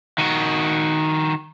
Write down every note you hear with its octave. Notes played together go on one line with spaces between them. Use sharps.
D#3 F#4